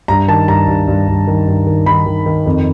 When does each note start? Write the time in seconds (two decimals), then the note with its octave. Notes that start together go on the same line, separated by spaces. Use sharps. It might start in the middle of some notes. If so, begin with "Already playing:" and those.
0.08 G2 A#5
0.28 D#3 A5
0.48 G2 A#5
0.67 G2
0.88 G2
1.08 G2
1.27 D#3
1.47 G2
1.67 D#3
1.86 D#3 B5
2.06 D#3
2.26 D#3
2.46 F2